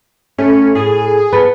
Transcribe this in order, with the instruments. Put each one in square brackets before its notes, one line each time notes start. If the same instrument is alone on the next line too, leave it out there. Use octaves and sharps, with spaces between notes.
[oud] A3 [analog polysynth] C#4
[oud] A2 [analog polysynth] G#4
[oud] B3 A4 B4